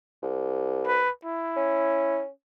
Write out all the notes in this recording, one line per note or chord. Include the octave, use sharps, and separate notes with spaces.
C2
B4
E4
C#4